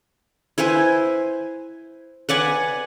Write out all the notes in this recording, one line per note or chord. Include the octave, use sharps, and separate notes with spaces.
E4 B4 C5 G#5
B4 D5 F#5 G#5